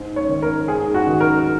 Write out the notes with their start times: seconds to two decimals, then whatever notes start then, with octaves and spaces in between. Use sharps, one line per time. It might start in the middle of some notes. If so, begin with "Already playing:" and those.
Already playing: G#2
0.16 C#5
0.29 D#3
0.42 A#4
0.68 G#2 G#4
0.94 F#4
1.07 D#3
1.20 A#4